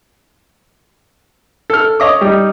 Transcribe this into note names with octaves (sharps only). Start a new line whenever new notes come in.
A4 F6
C#5 D#5 D6
G3 D#4